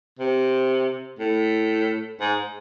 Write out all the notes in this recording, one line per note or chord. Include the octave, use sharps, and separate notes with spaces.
C3
A2
G#2